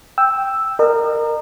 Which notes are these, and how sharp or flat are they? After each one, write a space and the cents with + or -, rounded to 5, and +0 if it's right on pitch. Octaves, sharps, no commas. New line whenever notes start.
G5 +0 E6 +0
A#4 -10 D#5 -45